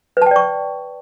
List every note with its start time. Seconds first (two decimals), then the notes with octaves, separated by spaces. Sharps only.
0.17 B4
0.22 A5
0.26 G5
0.31 D5
0.36 C#6